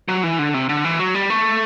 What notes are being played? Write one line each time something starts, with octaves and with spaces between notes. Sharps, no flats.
F#3
E3
D3
C3
D3
E3
F#3
G3
A3